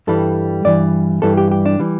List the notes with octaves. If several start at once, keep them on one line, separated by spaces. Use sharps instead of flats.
G2 E3 G3 A4
G2 E3 G3 D5
G2 E3 G3 A4
G4
G4
D4
E3 G3